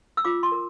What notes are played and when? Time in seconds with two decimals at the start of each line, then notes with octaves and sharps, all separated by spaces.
0.17 E6
0.25 F4 D6
0.43 C6
0.52 A#4